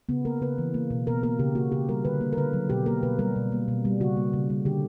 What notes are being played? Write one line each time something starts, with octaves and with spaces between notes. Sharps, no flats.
C#3 B3
A#3 A#4
C#3 B4
E3
A#3
B2
B2 A#4
A#3 A#4
C#3 G4
A#3 F#4
C#3 G4
G3 A#4
D3 B4
A#3
A#4
D3 B4
F#3
B2 G4
A#3 A#4
B2 B4
G3 A#4
B2
A#3
B2
G3
C#3 F#4
A#3
C#3
G3
D3 G4